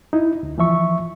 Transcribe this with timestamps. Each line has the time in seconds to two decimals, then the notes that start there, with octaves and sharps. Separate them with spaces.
0.13 D#4 E4
0.43 D2
0.58 E3 F3 E5 C#6